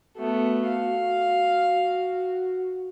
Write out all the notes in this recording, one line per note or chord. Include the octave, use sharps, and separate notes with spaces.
A3 B3 F#4
F5